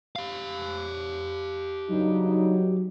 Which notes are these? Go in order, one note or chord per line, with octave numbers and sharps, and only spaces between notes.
G4 F5
G2 C#3 F#3 D#4